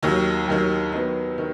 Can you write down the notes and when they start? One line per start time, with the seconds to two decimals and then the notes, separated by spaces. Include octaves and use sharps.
0.03 D#2 D#3 F#3
0.48 D#2 D#3 F#3
0.93 D#3 F#3 B3
1.38 D#3